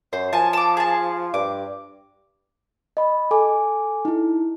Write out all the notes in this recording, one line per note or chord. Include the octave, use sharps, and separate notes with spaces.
F#2 C5
F3 G#5 A5
A5 D6
G#4 A5
G2 D6
D#5 B5
A4 G#5 D6
D#4 E4